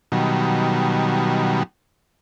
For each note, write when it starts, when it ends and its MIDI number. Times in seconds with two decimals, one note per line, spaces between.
0.12 1.63 47
0.12 1.63 51
0.12 1.63 54
0.12 1.63 55